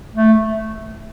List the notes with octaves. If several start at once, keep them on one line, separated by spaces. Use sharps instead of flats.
A3